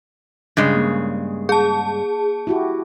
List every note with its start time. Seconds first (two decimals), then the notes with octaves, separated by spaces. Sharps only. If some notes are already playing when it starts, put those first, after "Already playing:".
0.57 G2 C#3 G#3
0.75 A#3
1.49 G#4 A5
2.47 E4 F#4 G4